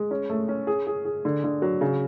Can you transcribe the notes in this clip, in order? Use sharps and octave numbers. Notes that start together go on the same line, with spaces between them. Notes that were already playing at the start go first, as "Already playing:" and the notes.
Already playing: G#3
C#4
A3
C#4
G#4
G#4
G#4
D3
D3
F#3
C#3